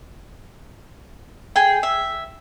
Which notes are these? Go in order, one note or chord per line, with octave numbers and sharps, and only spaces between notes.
G#4 G5
E5